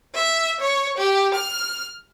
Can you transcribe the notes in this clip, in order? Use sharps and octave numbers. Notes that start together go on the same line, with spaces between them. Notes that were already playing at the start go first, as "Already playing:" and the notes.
E5
C#5
G4
F6